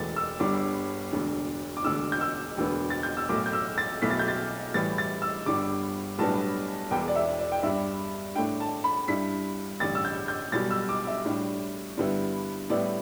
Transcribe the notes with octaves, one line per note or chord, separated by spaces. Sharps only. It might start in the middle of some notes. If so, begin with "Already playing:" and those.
Already playing: E1 E2 E3 A3 A6
E6
G1 G2 G3 D6
E1 D2 D3
D6
E1 D2 D3 E6
G6
E6
E1 D2 D3 B3
A6
G6
E6
B1 A2 A3 D6
G6
E6
A6
B1 B2 A3 E4 B6
A6
G6
A6
A2 E3 G3 E4 A6
A6
E6
G1 G2 G3 D6
B1 A2 G3 B3 D4 A5
E1 E2 E3 G5
D5
E5
D5
G5
G2 G3 D4 E5
A2 A3 D4 G5
A5
B5
G2 G3 E4 B6
A1 G2 D3 G3 A6
E6
G6
G6
B1 B2 G3 A6
E6
D6
E5
A2 G3 D4
G2 D3 G3 B3 E4
A2 G3 B3 E4 D5